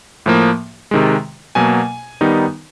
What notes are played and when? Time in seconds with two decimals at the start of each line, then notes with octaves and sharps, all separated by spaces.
0.26 A2 F3 A#3
0.91 C3 D#3 G#3
1.55 B2 F#3 A#3 G#5
2.21 D#3 G3 B3 D#4